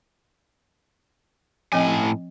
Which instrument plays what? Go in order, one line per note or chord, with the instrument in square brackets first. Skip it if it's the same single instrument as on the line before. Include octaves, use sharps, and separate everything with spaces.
[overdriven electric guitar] A2 G#5 [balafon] F3 C4 D#5